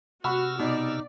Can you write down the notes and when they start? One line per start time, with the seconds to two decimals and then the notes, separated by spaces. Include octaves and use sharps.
0.24 C3 F#4 F#5 B5 C#6 E6 F6
0.59 B2 D#4 D5